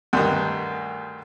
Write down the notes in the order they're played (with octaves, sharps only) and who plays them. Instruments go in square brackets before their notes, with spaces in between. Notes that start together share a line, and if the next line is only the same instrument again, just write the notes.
[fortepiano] D2 G2 D#3